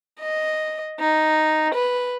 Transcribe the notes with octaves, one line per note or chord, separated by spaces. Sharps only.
D#5
D#4
B4